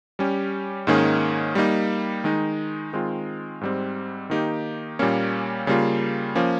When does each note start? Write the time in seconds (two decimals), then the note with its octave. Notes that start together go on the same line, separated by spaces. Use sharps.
0.19 G3 C#4 G4
0.87 G#2 D#3 A#3 C#4 G#4
1.55 G3 A#3 D#4
2.24 D#3 G#3 D#4
2.93 D#3 G#3 C4 F4
3.61 G#2 G3 C4
4.30 D#3 A#3 D#4 G4
4.99 A#2 G3 A#3 C#4
5.67 C#3 G3 A#3 F4
6.35 F3 A#3 C#4